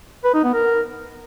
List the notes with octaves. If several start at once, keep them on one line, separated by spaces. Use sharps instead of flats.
B4
D#4
B3
A#4